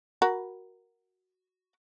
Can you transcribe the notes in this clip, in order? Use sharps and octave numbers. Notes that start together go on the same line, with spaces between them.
F#4 A#4 B5